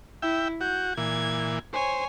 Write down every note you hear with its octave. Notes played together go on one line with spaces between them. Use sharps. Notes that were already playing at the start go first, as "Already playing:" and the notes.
E4 E5 G5
F#4 G6
A#2 E3 G#6
C5 C#5 G#5